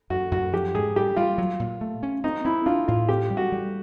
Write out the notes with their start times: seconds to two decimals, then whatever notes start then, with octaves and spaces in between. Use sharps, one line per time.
0.10 F#2 F#4
0.31 F#2 F#4
0.53 F3 G4
0.74 G#2 G#4
0.96 G3 G4
1.16 G3 F4
1.38 F#3
1.60 A#2
1.81 A3
2.03 C#4
2.24 C4 D#4
2.45 C4 E4
2.66 D4 F4
2.88 A2 F4
3.09 C4 G4
3.30 G3
3.37 F#4
3.52 G3